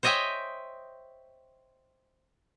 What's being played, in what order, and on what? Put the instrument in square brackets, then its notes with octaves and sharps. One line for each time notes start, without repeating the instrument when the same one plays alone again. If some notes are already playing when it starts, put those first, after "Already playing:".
[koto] C5 C#5 D#5 E5 G5 G#5